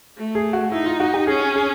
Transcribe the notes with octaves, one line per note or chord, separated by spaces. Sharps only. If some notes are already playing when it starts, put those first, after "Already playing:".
A3
G#4
F#4
D#4 E4
F4
F#4
G4
C#4 G#4
G#4